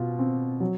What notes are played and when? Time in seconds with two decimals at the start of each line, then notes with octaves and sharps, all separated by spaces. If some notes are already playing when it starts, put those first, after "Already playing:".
Already playing: B2 F4
0.19 C4
0.60 F#3